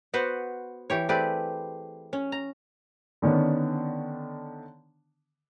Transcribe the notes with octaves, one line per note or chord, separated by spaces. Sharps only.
B3 F#4 B4 C5
E3 G4 C#5
A3 C4 G4 G#4 B4 D5
C#4
A#5
D3 D#3 B3 C#4 D4